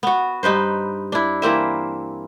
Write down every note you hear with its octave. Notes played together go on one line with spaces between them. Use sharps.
B3 F#4
G2 D#4 B4 C5
D4 E4
E3 A#3 C4 E5